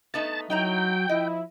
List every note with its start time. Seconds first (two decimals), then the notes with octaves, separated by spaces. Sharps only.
0.14 A3 B3 D#4 A5
0.50 F#3 D#4 E4 G5 A#5
1.09 F3 E4 D#5